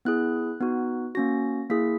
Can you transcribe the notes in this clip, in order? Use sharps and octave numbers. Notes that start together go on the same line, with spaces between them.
B3 E4 G#4 F#6
B3 D#4 F#4
A#3 C#4 F#4 A#6
A#3 E4 G#4 B6